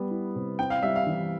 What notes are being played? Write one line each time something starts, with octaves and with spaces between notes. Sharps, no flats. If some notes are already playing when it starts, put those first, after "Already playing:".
Already playing: G3 B3
E4
C3
C4 G5
F5
G3 E5
F5
E3